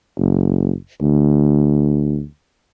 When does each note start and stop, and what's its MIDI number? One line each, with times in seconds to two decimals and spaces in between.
0.19 0.72 30
1.02 2.23 38